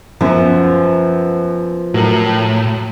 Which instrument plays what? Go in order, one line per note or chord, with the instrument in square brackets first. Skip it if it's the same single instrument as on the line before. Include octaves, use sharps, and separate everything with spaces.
[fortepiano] F#2 [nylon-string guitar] F3 B3
[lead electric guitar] A2 [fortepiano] F#3 A#4